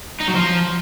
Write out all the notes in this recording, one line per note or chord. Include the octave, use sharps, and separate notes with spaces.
D#4
F#3
F3